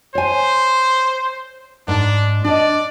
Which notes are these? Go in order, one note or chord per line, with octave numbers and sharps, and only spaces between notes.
C5 C#5 G#5
G#2 D4
D4 D5 D#5